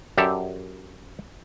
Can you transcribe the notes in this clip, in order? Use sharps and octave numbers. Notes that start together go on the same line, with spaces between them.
F#2 G4 A4 D5